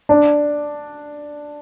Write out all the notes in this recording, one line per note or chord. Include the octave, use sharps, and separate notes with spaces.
D4